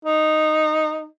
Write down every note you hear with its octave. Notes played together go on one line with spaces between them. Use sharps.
D#4